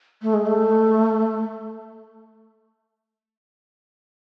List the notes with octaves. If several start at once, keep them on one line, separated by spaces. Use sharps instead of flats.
A3
G#3
A3